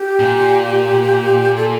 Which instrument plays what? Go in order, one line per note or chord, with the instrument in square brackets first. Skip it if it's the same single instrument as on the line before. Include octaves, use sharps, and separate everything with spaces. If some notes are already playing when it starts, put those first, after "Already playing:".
Already playing: [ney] G4
[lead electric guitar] A#2
[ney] A4